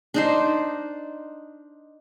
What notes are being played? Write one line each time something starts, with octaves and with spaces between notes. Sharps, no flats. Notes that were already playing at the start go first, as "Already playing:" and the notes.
D4 D#4 C5